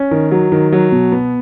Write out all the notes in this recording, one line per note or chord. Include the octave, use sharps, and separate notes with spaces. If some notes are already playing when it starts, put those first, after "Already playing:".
Already playing: C#4
D#3
F#3
D#3
F#3
B2
B3